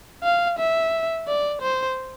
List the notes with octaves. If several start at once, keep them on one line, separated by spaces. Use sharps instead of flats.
F5
E5
D5
C5